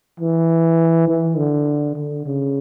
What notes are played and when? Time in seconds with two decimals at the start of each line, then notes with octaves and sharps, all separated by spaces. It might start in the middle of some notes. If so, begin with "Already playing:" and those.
0.20 E3
1.07 E3
1.37 D3
1.96 D3
2.26 C#3